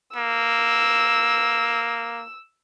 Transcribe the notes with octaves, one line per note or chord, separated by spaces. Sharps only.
A#3 E6